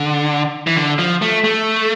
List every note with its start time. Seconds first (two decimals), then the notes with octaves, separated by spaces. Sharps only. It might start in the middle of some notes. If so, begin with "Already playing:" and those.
Already playing: D3
0.67 E3
0.76 D3
0.99 F3
1.22 A3
1.44 A3